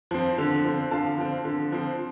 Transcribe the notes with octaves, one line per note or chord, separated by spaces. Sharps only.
F3 C4
D3
F3 C4
D3 F5 A5
F3 C4
D3
F3 C4